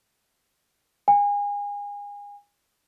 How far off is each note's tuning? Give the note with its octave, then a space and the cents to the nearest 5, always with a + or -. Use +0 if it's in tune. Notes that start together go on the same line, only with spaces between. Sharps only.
G#5 -30